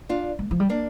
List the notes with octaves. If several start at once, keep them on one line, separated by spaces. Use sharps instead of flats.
D4 F4
G#3
F3
G3
A#3 D4